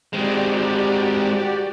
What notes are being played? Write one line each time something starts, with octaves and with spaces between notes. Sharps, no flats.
G#3 C4 F#4 G4 D5